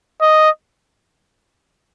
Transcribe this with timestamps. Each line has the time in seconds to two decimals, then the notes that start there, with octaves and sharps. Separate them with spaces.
0.21 D#5